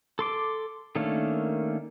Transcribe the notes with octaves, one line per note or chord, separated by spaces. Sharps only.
A4 C6 D6
D#3 A3 A#3 C#4 D4